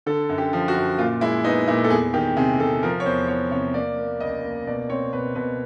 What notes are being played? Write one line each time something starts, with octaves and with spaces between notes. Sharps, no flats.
D3 A4
F#2
G4
F3
F#4
F#2
A#2 F4
G#3 E4
B3 D#4
A#2 E4
A4
E2 G#4
D#3 G4
C3 G#4
C3 A4
F3 A#4
C#5
E2 C5
E2 C#5
C3 C#5
A#3 D5
A#3
C#2 D#5
A#3
B2 D5
C4 C#5
B2 B4
B2 B4